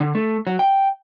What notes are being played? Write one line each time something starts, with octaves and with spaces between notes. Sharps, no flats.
D3
A3
F#3
G5